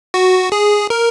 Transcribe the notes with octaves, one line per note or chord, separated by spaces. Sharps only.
F#4
G#4
A#4